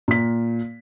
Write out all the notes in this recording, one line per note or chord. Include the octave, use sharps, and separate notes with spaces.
A#2 B6